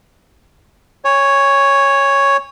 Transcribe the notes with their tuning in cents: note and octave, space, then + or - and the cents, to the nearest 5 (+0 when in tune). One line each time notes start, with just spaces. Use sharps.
C#5 +0 G#5 -30